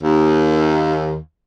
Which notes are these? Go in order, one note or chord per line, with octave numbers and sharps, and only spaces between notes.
D#2